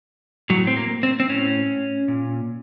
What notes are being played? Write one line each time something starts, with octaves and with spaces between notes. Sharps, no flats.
A2 F#3
C4
A#3
C4
C4
A2 C#4
A#2